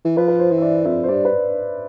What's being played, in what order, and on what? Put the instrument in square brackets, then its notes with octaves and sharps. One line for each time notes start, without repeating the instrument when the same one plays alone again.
[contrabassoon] E3
[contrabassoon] F3 [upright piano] B4
[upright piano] B4
C5
[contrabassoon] E3
[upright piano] E5
D5
[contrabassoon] F2 [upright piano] E5
[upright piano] C5
[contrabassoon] G2 [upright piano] D5
[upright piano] B4